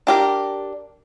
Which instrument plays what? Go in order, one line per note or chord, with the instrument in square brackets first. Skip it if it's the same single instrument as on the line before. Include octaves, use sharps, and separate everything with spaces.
[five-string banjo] D4 G4 A#4